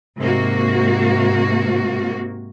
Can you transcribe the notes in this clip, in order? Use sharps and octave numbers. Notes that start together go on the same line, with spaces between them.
G#2 C3 A#3 F#4